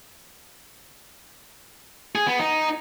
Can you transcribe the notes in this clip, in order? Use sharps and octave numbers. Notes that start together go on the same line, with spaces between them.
G#4
B3
D#4